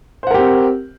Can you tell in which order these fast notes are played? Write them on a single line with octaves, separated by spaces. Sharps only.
C5 F#5 A#4 G4 C4